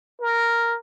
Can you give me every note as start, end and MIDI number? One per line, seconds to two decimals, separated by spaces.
0.21 0.77 70